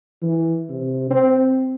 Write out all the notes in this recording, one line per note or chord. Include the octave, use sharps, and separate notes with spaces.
E3
C3
C4